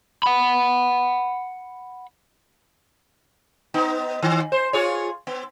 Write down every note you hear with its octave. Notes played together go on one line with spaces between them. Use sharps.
F#5 B5
B3 D#4
D#3
C5
F4 G#4 C#5
B3